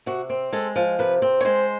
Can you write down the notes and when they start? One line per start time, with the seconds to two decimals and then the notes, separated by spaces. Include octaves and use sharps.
0.06 C3 F#4
0.30 C4
0.53 G#3 A4
0.76 F3
0.99 C3 B4
1.22 C4
1.41 C#5
1.45 G#3 C5